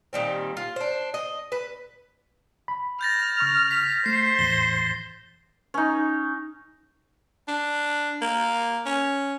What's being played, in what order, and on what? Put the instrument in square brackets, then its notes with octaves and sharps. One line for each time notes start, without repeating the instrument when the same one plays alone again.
[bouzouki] A#2 D#3 G3 C4
F4
D4 C5
D#5
B4
[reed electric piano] B5
[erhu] F6 [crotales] G6 A6 A#6
[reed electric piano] C#3 C#6
[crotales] B6
[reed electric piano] A3 [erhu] C5 [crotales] C7
[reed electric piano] E2 A2 E3 [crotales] G7
[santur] C#4 D#4
[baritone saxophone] D4
A#3
C#4